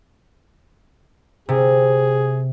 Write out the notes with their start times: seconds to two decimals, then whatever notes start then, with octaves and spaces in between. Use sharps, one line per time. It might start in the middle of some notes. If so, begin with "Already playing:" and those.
1.49 C3 G#4